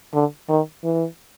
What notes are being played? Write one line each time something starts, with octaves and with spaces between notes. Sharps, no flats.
D3
D#3
E3